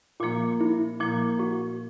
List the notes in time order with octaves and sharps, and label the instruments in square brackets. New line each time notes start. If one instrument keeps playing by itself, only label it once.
[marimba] A#2 F3 A#3 [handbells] F4
[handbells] E4
[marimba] A#2 F3 A#3
[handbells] F#4